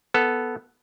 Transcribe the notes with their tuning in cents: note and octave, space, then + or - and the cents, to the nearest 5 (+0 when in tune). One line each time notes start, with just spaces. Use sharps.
B3 +0 A4 +0